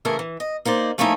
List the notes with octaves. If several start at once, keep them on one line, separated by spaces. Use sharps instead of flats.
C#3 E3 A3 E4 G#4 A#4
E3
D#5
A#3 D#4 C5 D5
F3 A3 A#3 C#4 D#4 E4